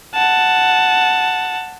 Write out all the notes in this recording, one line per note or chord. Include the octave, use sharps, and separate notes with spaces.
F#5 A5